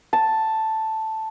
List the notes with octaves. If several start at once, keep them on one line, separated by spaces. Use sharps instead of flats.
A5